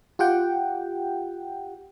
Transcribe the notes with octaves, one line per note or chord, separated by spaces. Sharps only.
F4 G4 F#5 G5